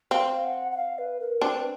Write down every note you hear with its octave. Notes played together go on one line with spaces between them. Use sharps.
C4 F5
F#5
F#5
F5
B4
A#4
C4 D4 B4
B4